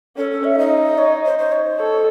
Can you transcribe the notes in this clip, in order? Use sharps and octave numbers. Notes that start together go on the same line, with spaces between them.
C#4 A4
A4
E5
D#4 D#5
C#5
C5
C5
C#5
C5
A4 C#5